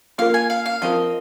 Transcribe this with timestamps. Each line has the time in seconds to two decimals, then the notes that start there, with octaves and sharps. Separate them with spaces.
0.18 A#3 F4 A#4 F5
0.34 G#5
0.50 F5
0.66 F5
0.82 F3 C4 F4 A#4 D#5